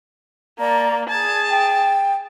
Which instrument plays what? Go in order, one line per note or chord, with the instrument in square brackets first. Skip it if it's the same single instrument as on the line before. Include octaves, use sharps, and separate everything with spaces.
[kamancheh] A#3 [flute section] D5 A5 A#5
[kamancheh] G#4 A5 [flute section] G#6
[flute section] G5